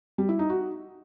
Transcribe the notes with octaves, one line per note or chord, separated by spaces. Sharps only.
G3
E4
D#4
F#4